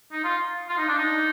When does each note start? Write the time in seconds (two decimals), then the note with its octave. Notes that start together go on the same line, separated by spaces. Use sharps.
0.12 D#4
0.24 F4
0.69 F4
0.78 D#4
0.88 D4
0.98 D#4